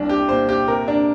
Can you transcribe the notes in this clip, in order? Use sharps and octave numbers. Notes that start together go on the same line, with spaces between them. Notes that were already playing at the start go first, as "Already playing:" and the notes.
Already playing: C2 A#3 D4
G4
A#2 C5
G4
C3 A#4
D4